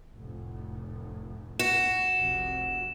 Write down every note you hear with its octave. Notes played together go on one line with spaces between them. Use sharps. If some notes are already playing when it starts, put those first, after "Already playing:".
F1 A2
F#4 E7
F1 C2